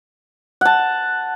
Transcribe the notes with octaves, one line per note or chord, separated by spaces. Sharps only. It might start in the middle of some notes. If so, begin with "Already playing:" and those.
F#5 A5